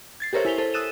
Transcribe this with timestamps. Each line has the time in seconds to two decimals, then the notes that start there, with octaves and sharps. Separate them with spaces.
0.20 G#6 A6 C7
0.33 G4 A4 A#4 C5 C#5 E5
0.45 E4 G#5 B6 F7 G7
0.58 A4 C5
0.74 D#6 E6 F#6 A6 D#7 E7